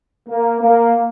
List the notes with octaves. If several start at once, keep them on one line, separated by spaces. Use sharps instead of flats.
A#3
A#3